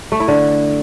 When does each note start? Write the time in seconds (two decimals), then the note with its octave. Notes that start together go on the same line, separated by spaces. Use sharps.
0.12 A3
0.20 E4
0.28 D3